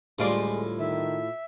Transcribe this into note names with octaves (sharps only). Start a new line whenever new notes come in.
D2 A2 G3 G#3 F4 D5
D#3 E5